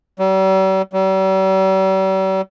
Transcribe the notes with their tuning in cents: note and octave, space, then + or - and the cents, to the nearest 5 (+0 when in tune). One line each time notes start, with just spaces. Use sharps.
G3 -45
G3 -45